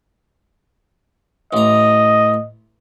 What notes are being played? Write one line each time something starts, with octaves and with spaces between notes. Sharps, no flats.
A1 D#5 A#5